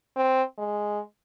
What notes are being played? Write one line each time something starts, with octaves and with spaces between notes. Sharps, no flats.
C4
G#3